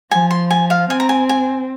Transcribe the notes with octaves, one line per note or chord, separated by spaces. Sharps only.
F3 G#5
C6
G#5
F5
C4 G#5
A#5
G#5
G#5